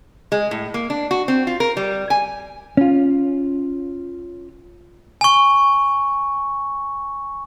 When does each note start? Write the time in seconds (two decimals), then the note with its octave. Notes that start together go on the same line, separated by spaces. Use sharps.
0.32 G#3
0.51 A2
0.74 A#3
0.90 D4
1.11 F#4
1.28 C4
1.47 F4
1.60 A#4
1.77 G3
2.10 G#5
2.77 C#4 F4
5.21 G#5 C#6